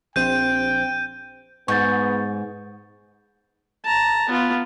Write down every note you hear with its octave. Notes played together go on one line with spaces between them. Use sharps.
A#1 C4 C5 G5 G6 D#7
G#2 B3 C#6 G6 A6
A5 A#5
B3 F4